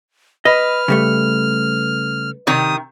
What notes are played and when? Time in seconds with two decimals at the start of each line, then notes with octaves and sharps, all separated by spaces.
0.45 B4 D#5 F6
0.88 C#3 G3 A3
2.47 C3 D#3 D#6